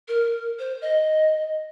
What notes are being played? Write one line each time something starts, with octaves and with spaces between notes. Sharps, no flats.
A#4
C5
D#5